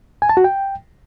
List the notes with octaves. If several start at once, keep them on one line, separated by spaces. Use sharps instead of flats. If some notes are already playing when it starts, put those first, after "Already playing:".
G#5
A5
F#4
G5